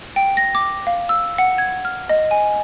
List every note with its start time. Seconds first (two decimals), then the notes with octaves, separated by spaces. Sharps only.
0.16 G5
0.37 A#6
0.55 D6
0.87 F5
1.09 E6
1.38 F#5
1.58 G#6
1.85 F6
2.09 D#5
2.31 G#5